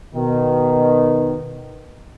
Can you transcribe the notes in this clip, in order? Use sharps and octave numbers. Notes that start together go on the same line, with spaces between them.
B2 D#3